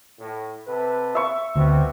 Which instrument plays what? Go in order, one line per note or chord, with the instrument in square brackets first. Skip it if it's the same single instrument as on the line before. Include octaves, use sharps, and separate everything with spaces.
[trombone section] A2
C3 A4 B4
[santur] E5 C#6
[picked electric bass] D2 [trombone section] B2 G3 C4